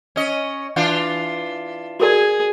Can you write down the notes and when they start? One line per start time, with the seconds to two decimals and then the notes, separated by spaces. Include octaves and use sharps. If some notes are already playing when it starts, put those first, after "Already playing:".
0.16 C#4 D#5
0.76 E3 D4 F4
2.00 F#4 G#4 A#4 D5